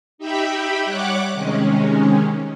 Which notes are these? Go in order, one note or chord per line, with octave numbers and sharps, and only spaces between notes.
D#4 G4 E5 G5 B5
G3 C#5 F#5 D6 F#6
C3 D#3 G#3 C#4